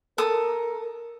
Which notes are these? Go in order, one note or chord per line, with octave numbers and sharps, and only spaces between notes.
A4 A#4 D#6